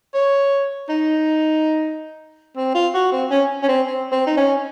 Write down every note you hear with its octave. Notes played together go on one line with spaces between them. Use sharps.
C#5
D#4
C4
F4
F#4
C4
C#4
C#4
C4
C4
C4
D#4
C#4